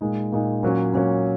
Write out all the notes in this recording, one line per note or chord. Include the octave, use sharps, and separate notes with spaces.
A#2 G#3 D#4
A#2 G#3 D#4
A#2 F#3 C#4
A#2 F#3 C#4